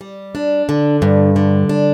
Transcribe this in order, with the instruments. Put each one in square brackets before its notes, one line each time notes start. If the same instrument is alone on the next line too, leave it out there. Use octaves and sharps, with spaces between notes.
[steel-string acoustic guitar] G3
D4
D3
G2
D3
D4